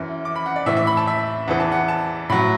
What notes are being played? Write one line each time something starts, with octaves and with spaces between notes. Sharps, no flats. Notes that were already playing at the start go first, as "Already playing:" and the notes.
Already playing: F#2 E3
D6
B5
F#5
D5
A2 E3 E5
E5
B5
A5
E5
E2 E3 F#5
A5
F#5
A5
A2 F#3 B5